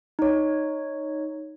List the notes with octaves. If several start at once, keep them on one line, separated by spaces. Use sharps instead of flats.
D#4 C#5